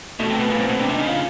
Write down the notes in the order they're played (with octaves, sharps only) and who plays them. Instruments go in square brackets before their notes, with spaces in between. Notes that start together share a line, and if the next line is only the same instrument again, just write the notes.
[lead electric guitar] B2 [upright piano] A3
[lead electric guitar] C3
[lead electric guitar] B2 [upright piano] B3
[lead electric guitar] A#2 [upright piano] A#3
[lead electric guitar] A#2 [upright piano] C4
[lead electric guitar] B2 [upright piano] B3
[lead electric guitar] C3 [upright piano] D4
[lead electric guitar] C3
[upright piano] D#4
[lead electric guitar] C#3
[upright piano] F4